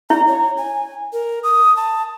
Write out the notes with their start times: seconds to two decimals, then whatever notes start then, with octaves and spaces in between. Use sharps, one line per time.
0.10 E4 A#5
0.27 C#5
0.57 G#5
1.13 A#4
1.43 D#6
1.77 A5